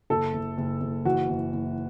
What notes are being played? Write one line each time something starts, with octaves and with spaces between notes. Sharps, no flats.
F#1 A4
F#1
F#1
F#1
E3 F#4
F#1
F#1